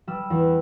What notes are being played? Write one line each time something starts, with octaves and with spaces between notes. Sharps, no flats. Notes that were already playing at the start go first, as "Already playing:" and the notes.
G3 E6
E2